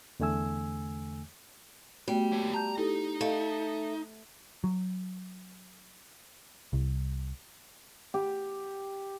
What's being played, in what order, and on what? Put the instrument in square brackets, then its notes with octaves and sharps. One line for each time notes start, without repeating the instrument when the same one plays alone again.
[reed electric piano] E2 D3 A3 G#5 E6
[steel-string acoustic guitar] G3 [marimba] A3 B3 F#4
[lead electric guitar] A#3 C#5
[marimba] A5 G6 [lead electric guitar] A#5
[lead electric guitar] D#4 [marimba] E4 G4 A4
[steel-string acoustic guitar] A3 [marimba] A4 D#5 F5
[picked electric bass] F#3
C2
[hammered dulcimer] G4